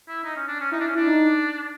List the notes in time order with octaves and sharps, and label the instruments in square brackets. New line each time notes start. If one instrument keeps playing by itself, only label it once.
[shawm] E4
D#4
C#4
D4
C#4
[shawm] D#4 [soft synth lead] E4
[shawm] D4
C#4
[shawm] D4 [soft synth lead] E4
[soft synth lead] D#4